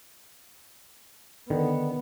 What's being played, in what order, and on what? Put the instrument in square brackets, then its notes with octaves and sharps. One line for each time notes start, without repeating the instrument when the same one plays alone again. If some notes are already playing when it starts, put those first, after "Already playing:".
[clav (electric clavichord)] D3 D#3 [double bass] B3